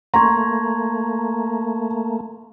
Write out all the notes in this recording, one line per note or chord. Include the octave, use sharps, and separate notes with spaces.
A3 A#3 A#5 C6 C#6 G#6